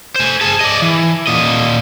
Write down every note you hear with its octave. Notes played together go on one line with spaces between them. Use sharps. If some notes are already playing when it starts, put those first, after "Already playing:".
C5 G#5
G#4 A5
D5 D#5
E3
A#2 D#5